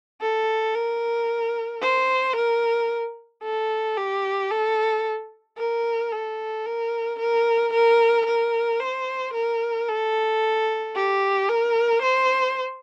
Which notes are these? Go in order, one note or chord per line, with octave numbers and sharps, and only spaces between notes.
A4
A#4
C5
A#4
A4
G4
A4
A#4
A4
A#4
A#4
A#4
A#4
C5
A#4
A4
G4
A#4
C5